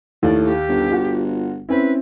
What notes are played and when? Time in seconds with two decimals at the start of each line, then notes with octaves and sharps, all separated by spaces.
0.23 D#2 A2 D5
0.44 G4
0.69 G1
0.90 F4 F#4 F#5
1.69 C4 C#4 E4 B4